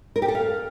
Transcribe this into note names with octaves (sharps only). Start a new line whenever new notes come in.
A#4
G4
A4
F5